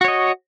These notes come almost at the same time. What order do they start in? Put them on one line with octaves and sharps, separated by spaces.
F#4 C#5 D#5